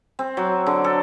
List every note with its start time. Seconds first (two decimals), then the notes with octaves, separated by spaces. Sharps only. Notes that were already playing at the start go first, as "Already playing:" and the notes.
0.19 C4
0.37 F#3
0.66 D3
0.84 A4